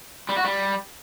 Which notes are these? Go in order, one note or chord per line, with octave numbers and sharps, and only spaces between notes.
G3
F#4
G3